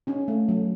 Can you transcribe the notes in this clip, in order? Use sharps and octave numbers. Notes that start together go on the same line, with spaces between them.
C#4 D#4
A3
F#3